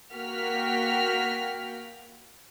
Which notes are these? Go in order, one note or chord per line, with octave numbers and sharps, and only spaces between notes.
A#3 F#4 G5 F6 B6